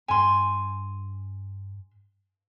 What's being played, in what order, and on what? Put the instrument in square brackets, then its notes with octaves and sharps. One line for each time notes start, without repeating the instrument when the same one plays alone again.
[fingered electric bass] G2 D4 [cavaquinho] G#5 C6